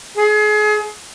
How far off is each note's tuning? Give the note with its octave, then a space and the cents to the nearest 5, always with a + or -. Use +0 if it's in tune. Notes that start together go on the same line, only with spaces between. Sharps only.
G#4 +30